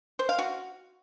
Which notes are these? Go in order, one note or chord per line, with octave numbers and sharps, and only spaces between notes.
C5
F5
F#4